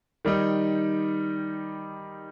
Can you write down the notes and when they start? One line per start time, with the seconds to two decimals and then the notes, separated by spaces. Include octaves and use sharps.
0.25 D#3 G3 D#4